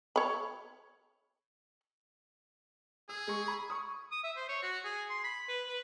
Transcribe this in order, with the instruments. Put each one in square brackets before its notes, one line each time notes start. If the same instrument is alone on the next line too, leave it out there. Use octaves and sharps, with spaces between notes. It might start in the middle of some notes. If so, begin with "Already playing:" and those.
[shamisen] C#5 B5
[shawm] G#4 [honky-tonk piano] E6
[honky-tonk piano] G#3 C#6
B5
C#6 D#6
[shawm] D#6
E5
C5
C#5
F#4
G#4
C6
B5
B4
B4